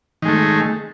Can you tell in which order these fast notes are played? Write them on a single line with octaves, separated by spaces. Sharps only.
D#3 G#3 A3